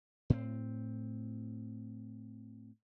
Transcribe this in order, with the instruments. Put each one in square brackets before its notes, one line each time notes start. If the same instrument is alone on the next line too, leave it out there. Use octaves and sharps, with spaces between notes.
[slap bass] A2 C4